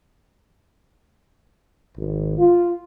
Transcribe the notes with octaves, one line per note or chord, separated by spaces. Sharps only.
G#1
F4